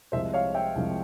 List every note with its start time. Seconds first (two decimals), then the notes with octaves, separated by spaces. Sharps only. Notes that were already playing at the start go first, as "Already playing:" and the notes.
0.12 C2 C3 F3 G#3 C5 E5
0.34 C#5 F5
0.54 E5 G5
0.76 C2 C3 F3 G#3